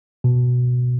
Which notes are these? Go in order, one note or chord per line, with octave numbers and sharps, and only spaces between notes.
B2